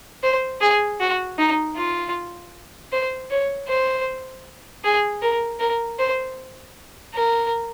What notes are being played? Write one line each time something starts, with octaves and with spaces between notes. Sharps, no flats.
C5
G#4
F#4
D#4
F4
C5
C#5
C5
G#4
A#4
A#4
C5
A#4